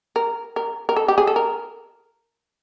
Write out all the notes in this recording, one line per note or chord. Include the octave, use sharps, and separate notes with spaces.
A#4
A#4
A#4
A4
G4
G#4
A4
A#4